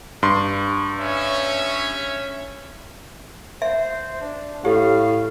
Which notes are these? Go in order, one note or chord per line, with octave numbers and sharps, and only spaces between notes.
G2 C6
C#4 C#5 E5
C5 E5
D4
A2 G4 F5